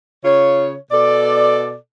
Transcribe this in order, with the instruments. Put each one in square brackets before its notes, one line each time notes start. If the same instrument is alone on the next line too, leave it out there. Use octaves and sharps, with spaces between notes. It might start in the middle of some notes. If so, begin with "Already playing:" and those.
[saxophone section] C#3 F4 C#5
B2 A4 D5